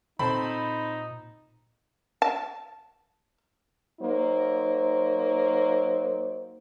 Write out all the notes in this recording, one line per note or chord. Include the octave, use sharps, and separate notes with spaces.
A#2 C4 D#4 A4 C5 B5
A5
F#3 A#3 D#4 C5